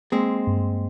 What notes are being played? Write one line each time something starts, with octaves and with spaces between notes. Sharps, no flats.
G#3 A#3 C4
G2